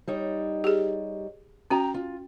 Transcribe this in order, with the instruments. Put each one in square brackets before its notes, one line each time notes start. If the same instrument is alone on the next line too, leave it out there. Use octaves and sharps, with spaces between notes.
[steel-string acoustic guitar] G3 D#4 C#5
[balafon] G4 G#4
[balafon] C#4 F#4 [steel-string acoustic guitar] G5 A#5
[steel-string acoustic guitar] F4